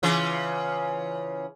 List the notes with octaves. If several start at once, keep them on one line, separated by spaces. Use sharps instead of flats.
C#3 E3 F4